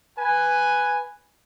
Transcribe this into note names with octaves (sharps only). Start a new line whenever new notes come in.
B4 G#5